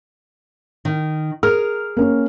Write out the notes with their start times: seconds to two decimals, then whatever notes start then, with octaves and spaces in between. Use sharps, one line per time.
0.85 D#3
1.43 G#4 A#4 F6
1.97 A#3 C#4